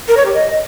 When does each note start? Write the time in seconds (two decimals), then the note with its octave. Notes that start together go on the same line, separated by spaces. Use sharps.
0.09 A#4
0.17 C#5
0.26 G4
0.34 D#5